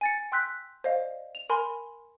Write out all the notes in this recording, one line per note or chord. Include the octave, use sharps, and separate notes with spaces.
G#5 A6 C#7
G5 C6 E6 F#6 G6 B6
C5 D5 D#5 F5
F7
A#4 G#5 B5 C6